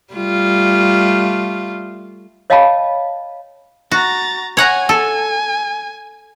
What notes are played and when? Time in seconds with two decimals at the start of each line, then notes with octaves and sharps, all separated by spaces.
0.13 G3 A3 F4
2.50 C#5 D#5 F5 G5 A5 B5
3.91 F#4 A#5 A6
4.57 C#5 F#5 G#5 A#5
4.89 A4 G#5